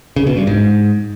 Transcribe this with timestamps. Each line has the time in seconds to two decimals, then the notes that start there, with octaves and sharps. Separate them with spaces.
0.16 C#3
0.27 B2
0.37 G2
0.47 G#2